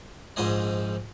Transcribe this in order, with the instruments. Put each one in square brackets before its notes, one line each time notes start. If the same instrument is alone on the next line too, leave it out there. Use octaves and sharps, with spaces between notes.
[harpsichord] A#1 G#2 F3 C5 D#5 G#5